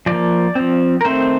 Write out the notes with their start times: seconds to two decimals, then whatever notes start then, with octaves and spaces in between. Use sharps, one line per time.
0.06 F3 A#3 D5
0.55 F3 C4
1.01 A#4
1.05 D#3 A3 C4 C5